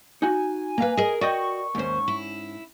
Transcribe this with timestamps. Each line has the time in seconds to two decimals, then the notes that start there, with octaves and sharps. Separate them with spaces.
0.22 D#4 F#4 G#5
0.78 A#3 B4 F5 A#5
0.97 G#4 A#4 D#5
1.21 F#4 D5 D#5 G5 C#6
1.75 D#2 G#2 C#4 C5
2.08 E4